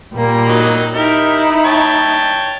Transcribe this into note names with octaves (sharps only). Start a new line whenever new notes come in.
A#2 G3 A#3
F#3 D#4 D#5
D#4 E4 G4 A#4
C#5 G5 A5